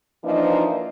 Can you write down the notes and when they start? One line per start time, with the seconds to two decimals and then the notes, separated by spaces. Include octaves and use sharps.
0.24 E3 F3 A#3 D4 D#4